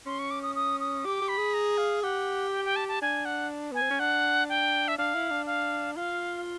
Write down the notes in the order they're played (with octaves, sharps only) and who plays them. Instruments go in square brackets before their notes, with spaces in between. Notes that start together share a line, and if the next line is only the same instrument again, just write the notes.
[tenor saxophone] C#4 [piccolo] C6
[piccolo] C#6
D6
D#6
D#6
D#6
[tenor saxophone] G4 [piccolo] D6
[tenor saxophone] G4
[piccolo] B5
[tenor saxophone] G#4
[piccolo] A#5
F5
[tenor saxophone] G4 [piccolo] F#5
[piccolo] G5
G5
A5
A5
[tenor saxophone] D4 [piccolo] G#5
[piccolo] F#5
[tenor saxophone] B3 [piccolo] G#5
[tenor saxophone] C4
C#4
[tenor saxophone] D4 [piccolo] F#5
[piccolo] G5
E5
[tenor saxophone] D4 [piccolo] F5
[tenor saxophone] E4
D4
[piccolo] F5
[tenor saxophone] F4 [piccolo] F5